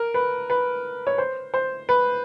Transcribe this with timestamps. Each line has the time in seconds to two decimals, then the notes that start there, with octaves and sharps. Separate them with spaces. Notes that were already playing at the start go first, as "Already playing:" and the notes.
Already playing: A#4
0.14 B4
0.50 B4
1.07 C#5
1.18 C5
1.54 C5
1.89 B4